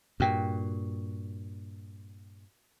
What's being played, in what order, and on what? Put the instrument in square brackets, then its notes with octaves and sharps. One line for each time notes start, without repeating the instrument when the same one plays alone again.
[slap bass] G2 A#2 [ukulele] F#4 G5